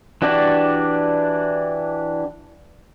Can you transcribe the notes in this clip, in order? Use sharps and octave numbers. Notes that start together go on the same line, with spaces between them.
E3 D4 F#4 G4 D5